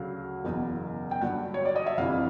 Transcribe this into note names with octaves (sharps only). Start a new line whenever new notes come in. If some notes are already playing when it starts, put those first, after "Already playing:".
Already playing: D2 C#3 F#3 F5
F#1 E2 B2
G5
G2 D3 F#3 F#5
C#5
D5
D#5
E5
G1 F2 C3 E3 F5